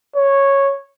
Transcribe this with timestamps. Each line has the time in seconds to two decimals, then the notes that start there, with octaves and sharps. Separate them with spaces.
0.16 C#5